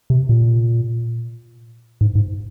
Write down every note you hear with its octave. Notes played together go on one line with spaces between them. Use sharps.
C3
A#2
G#2
G#2